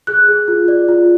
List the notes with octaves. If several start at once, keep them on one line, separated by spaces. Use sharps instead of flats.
G#4 F#6
G#4
F4
D5
F4